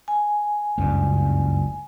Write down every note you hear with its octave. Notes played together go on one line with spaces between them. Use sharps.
G#5
F#1 C#2 G2